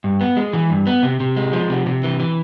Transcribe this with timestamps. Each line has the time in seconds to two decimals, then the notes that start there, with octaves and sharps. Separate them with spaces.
0.04 G2
0.21 B3
0.37 G#3
0.53 E3
0.70 G2
0.87 B3
1.03 C3
1.20 C3
1.36 G#3
1.53 F3
1.70 C3
1.86 C3
2.03 E3
2.20 E3